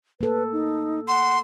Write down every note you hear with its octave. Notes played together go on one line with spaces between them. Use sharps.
A#3 A4 B4
D#4
F#5 C6